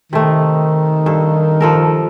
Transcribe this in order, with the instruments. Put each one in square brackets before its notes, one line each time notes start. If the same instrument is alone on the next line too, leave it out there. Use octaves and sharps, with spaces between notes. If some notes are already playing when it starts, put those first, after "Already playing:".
[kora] C3 A3 [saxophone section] D#3
[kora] G2 A4
F3 A4 A#4